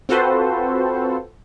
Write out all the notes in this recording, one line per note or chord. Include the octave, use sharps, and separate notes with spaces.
C4 F4 F#4 A4 B4 C5